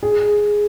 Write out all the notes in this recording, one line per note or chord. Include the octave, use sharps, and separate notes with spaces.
G#4